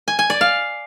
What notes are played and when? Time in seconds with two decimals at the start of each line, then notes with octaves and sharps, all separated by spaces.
0.08 G#5
0.19 G#5
0.30 D5
0.41 F5